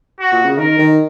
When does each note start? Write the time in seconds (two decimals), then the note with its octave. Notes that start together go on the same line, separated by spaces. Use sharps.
0.20 F#4
0.32 A#2
0.45 C#3
0.58 D#3 A#4
0.78 D#3